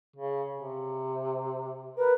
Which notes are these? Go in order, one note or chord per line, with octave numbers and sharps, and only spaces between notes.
C#3
C3
A#4 B4